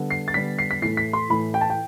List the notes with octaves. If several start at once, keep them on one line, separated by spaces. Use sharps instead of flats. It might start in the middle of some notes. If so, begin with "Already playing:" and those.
Already playing: D3 G3 B3
C7
A6
D3 G3 B3 B6
C7
B6
A2 E3 A3 C7
B6
C6
A2 E3 A3 B5
G5
A5
G5